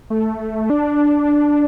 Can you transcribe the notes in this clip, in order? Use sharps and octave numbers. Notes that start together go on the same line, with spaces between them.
A3
D4